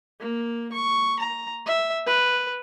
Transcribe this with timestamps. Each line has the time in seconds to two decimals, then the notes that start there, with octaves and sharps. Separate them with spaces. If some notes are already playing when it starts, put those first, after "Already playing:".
0.20 A#3
0.73 C#6
1.19 A#5
1.66 E5
2.07 B4